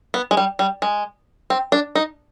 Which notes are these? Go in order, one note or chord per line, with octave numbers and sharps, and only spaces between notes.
B3
G#3
G3
G3
G#3
C4
D4
D#4